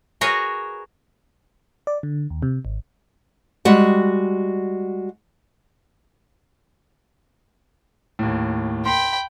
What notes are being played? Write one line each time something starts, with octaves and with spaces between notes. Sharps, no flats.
F#4 G#4 A#4 B4 C#5
D5
D3
D#2
C3
G#1
G3 G#3 F#4 F#5
D#2 A2
G5 B5 C6